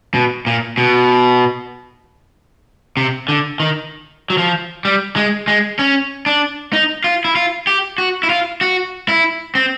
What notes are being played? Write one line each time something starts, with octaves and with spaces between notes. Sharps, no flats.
B2
A#2
B2
C3
D3
D#3
F#3
F3
G3
G#3
G#3
C#4
D4
D#4
F4
E4
F4
G4
F#4
E4
F4
F#4
E4
C4